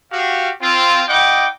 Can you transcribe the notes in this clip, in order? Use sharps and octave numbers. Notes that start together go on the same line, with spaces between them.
F#4 G4 F5
C4 F4
E4 D#5 F#5 G5 D6